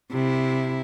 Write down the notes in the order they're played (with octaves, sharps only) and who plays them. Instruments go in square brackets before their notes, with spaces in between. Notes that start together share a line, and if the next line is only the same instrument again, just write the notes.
[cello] C3 E4